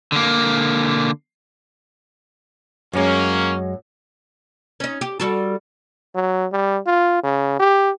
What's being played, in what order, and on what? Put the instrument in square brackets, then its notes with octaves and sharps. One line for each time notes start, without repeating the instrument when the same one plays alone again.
[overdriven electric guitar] D3 A#3
[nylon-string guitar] F#2 G#3 [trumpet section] A#3 C#4
[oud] C#4 D#4
G4
G3 F#4 A4
[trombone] F#3
G3
F4
C#3
G4